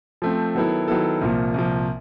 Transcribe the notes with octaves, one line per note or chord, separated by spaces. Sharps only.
F3 A3 C4
D#3 F#3 B3 E4 A4
D#3 F#3 B3 E4 A4
C2 A#2 F3
C2 A#2 F3